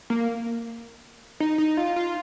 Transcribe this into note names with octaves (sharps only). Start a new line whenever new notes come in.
A#3
D#4
D#4
F4
F4